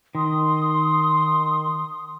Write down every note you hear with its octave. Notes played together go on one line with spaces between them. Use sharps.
D#3 C6 D#6